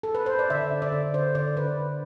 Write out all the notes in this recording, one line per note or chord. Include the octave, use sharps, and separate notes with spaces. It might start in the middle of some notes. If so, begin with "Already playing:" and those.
A4
B4
C5
D5
D3 E5
D3
D5
D3
D3 C5
D3 D5
D3 B4